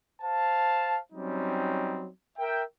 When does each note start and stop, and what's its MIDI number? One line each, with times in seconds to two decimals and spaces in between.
0.22 0.99 72
0.22 0.99 77
0.22 0.99 81
1.13 2.08 54
1.13 2.08 55
1.13 2.08 60
1.13 2.08 61
1.13 2.08 63
2.38 2.62 70
2.38 2.62 76
2.38 2.62 79